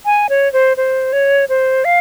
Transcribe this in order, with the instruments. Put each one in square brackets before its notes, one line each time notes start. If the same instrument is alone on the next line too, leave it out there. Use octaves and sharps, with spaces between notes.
[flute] G#5
C#5
C5
C5
C#5
C5
F5